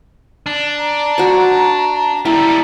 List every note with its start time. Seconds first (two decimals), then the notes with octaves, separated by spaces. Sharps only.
0.46 D4
0.79 A#5
1.18 F#4 C5
2.25 G3 E4 A4 A#5